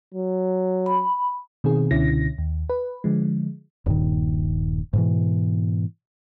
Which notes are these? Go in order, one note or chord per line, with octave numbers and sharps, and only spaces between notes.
F#3
B5
B2 D#3 C4 G#4
C#2 B2 D3 C#4 E4 A#6
D#2
B4
D3 F3 G#3
D#1 G2 A#2 D#3
G#2 B2 E3